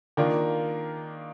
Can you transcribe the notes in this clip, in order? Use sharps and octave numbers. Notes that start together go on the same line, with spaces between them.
D#3 A#3 D4 F4